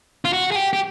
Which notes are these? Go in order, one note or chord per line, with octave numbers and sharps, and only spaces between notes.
F4
F#4
G#4
G4
G4